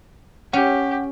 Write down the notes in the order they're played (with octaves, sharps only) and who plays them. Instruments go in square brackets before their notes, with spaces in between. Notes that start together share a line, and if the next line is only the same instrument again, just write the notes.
[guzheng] C#4 [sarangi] G4 [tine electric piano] F#5